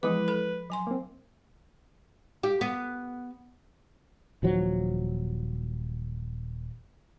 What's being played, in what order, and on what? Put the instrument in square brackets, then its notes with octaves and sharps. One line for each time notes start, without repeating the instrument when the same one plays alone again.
[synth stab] E3 G#3 B3 [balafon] F3 D6 [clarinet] B4
[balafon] A4 B5
F#3 G#5 C6
[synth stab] A#3 C4
[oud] G4
B3
[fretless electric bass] D#1 F3 F#3